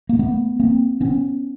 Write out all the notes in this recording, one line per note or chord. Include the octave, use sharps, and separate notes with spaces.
A#3
A3 B3
A#3 C4
B3 C#4